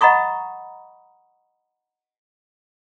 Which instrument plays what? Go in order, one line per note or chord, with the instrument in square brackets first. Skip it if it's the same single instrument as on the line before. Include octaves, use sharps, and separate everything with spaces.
[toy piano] D#5 F#5 A#5 B5 C#6 D#6